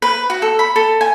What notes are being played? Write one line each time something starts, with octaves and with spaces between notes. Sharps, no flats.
B4
F#4
A4
B5
A4
G#5